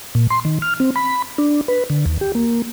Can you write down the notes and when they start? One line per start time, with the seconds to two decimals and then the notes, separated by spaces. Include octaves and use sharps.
0.15 A#2
0.30 C6
0.45 D#3
0.62 F6
0.80 C4
0.96 B5
1.38 D4
1.68 B4
1.90 D3
2.06 D#2
2.21 G4
2.35 A#3